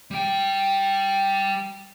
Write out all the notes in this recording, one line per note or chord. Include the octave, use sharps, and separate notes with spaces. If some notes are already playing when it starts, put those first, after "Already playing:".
G3 G5